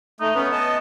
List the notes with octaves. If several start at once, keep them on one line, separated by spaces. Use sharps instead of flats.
A3 D#4
B3 C#4 B4
D#5 A5